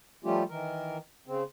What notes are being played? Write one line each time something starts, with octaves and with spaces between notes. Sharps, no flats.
F3 G3 A3 C#4 F4 G4
D#3 E3 A#4
C#3 C4